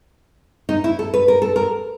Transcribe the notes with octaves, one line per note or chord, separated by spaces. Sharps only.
D#4
E4
A4
B4
A#4
A4
A#4